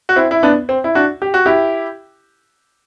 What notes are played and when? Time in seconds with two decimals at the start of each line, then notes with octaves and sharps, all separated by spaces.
0.09 F#4
0.16 C4 E4
0.31 E4
0.43 B3 D4
0.69 C4
0.84 E4
0.95 D4 F#4
1.22 G4
1.34 F#4
1.46 E4 G4